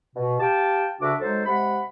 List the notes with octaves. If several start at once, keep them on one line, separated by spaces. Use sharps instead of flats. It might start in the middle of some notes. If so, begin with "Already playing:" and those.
B2
G4 F5 G5 A5
D2 C#3 D4 F#4 E5 D6
F#3 G#3 D#4 A4 C5
C3 G#3 F#5 B5